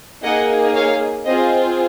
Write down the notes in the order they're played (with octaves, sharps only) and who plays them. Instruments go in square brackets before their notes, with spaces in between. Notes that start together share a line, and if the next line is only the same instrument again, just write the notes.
[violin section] A#3 D#4 G#4 D#5 F#5
C#5 F5
C4 F4 G#4 C5 D#5